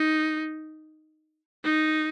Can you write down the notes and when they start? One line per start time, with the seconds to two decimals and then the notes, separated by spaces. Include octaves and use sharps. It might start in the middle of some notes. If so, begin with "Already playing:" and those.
Already playing: D#4
1.64 D#4